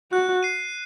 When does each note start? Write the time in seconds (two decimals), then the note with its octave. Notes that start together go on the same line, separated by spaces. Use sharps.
0.12 F#4 F#6
0.43 C7 D#7